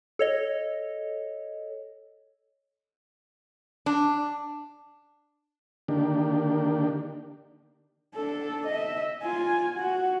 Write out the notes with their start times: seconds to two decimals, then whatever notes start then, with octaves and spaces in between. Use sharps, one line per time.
0.19 A4 C#5 D#5
3.86 D4
5.88 D3 D#3 A#3 D4 G4
8.15 D4 A4
8.67 D#5 E5
9.23 F4 G#5
9.77 F#4